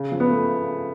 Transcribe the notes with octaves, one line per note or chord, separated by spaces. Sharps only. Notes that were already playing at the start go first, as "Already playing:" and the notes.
Already playing: C#3
F3
B3
A3